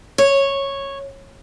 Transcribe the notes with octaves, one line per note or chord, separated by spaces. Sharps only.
C#5